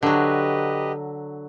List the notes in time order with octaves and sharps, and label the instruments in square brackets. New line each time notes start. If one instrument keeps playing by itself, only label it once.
[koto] D3 F#3 [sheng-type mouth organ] G4 B4 D#5